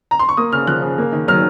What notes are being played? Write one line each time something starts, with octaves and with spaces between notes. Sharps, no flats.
A#5
C6
C#6
A#3 D#6
C#3 F6
F3 F#6
C#3
A#3
D#3
F#3 F6